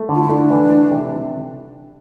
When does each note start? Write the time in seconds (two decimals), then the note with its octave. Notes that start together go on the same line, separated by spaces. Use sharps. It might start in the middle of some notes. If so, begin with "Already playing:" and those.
Already playing: A3
0.09 D3
0.14 F4
0.22 E4
0.29 A3 D4
0.50 E3
0.71 A3
0.91 C3